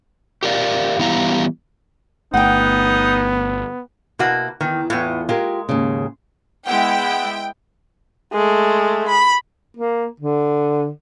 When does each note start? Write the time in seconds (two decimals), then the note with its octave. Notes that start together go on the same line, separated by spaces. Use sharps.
0.43 G4 A#4 D5 F5
0.99 E3 G3 B3 E4 F5 A#5
2.34 G1 A3 B3 D#4 F#5 G5
4.19 B2 A#3 E4 F#4
4.61 E2 D#3 E3
4.90 E2 A2 B3 F4
5.29 G#3 F4 G4 A#4
5.69 D#2 G#2 C#3
6.66 G#3 B3 E4 F#5 G5
8.32 G#3 A3
9.08 B5
9.77 A#3
10.20 D3